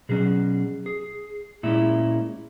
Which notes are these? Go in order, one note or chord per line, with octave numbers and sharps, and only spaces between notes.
B2 F#3 C#4 G#4
G#4
A#2 G#3 C#4 E4